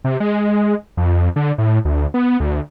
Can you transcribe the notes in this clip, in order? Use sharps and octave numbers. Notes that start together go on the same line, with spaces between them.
C3
G#3
F2
D3
A2
D2
B3
D2